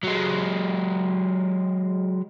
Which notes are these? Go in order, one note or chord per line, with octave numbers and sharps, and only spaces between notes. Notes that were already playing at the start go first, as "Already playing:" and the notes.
F#3 G#3